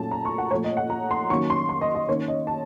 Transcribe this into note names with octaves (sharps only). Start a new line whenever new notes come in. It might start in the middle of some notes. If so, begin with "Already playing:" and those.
Already playing: A#2 F#3 A3 C#4 A5
A#5
C#6
F#5
A#2 F3 A3 C#5
D#5
F#5
A#5
C6
D#3 F#3 A#3 C#4 C#6
C6
C6
D#5
D#5
D#3 A#3 C#4 C#5
D#5
A5